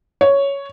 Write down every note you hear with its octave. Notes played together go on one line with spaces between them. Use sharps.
C#5